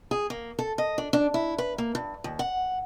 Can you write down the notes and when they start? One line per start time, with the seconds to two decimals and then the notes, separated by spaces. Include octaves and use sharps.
0.11 G#4
0.30 A#3
0.59 A4
0.78 D#5
0.98 D4
1.13 D4
1.34 E4
1.58 B4
1.78 A#3
1.95 G2
2.24 D#2
2.39 F#5